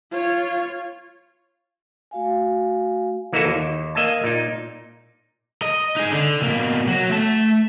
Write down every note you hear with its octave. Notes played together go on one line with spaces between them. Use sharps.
F4 C#5
A3 F#4 F5 G#5
E3 A#3 D#4 E4 F#4 A4
D#2
A#3 D#5 E5 G#5 A5
A#2 D#4
D#5
D#4 G#4
D3
B2 A#3
F#3 F#4
A3 A5